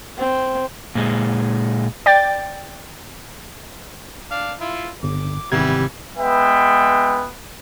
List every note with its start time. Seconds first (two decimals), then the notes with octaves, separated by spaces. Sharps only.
0.18 C4
0.95 A#2 G#3
2.06 D5 G5 A6
4.31 D4 F5
4.60 E4 F4
5.03 G1 D6
5.52 G#1 C3 E3 G3 B3 G#6
6.17 G#3 B3 B4 E5 G5